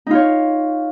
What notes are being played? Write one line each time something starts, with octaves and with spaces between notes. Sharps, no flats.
D#4 F4 C#5